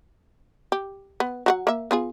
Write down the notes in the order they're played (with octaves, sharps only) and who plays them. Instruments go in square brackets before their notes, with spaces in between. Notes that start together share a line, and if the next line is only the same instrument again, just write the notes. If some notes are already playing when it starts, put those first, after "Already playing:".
[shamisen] G4
B3
F#3 F#4 F#5
A#3 E5
B3 F4 G#4